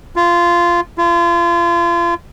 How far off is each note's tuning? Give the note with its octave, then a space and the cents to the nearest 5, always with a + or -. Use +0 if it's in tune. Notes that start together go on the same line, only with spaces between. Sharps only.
F4 -15
F4 -35